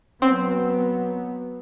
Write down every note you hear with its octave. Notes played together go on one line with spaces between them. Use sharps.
F#3 B3 C4